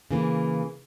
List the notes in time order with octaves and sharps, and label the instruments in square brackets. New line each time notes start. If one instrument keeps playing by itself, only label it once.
[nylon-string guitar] C#3 E3 A#3